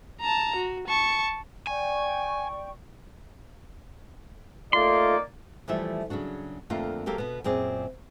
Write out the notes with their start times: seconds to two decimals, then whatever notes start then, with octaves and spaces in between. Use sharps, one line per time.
0.21 A5 A#5
0.56 F#4
0.87 A5 C#6
1.67 D5 G5 G#5 C#6
4.73 A3 A#3 D#4 F4 D5 C6
5.68 E3 F3 G3 A3 E5
6.10 C#3 F#3 D4 F#4
6.70 F2 D3 A3 A#3 F4
7.06 F#3 A#3 G4 A4 A#4 F5
7.18 B2 B3
7.44 F#2 A#2 C4 G#4 D5